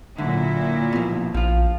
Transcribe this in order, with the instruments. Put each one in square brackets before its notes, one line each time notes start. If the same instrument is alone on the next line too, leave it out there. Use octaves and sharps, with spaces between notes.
[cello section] A#2 F#3 E4 [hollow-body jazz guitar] D3
[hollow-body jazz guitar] B2 F3
[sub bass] A#1 [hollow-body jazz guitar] F3 F4